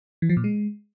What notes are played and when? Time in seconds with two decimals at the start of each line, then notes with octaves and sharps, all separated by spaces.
0.22 E3
0.29 F3
0.37 A#2
0.44 G#3